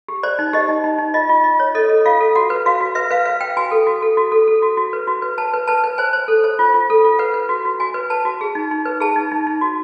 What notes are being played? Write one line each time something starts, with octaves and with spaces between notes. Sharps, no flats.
G4
C5 D5
D#4
G4 D#5
D#4
D#4
D#4
F4 D#5
F4
F4 D#5
C#5
A4 D#5
A4
F4 F5
A4
F#4 F#5
B4
F#4 F5
F#4
B4 E5
B4 F5
B4 F5
B4 G5
F#4 G#5
A4
F#4
A4
F#4
A4
A4
F#4
F#4
B4
F#4
B4
B4 A5
B4
B4 A5
B4
C5 G#5
C5
A4
C5
F4
F4
A4
F4
B4 F#5
B4
F#4
F#4
F#4 G#5
B4
B4 A5
F#4
G#4
D#4
D#4
B4
G#4 A5
D#4
D#4
D#4
F#4